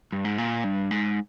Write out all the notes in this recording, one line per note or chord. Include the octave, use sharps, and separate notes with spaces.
G2
G#2
A#2
G2
G#2